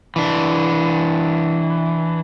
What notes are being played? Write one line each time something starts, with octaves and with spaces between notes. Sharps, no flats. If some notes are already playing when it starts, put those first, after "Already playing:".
E3 D4